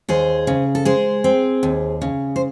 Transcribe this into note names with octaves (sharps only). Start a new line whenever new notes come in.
D#2 G#4 C5
C#3
A4
G#3 G#4 C5
C4
D#2
C#3
C5